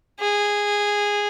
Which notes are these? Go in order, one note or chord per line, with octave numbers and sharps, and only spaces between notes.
G#4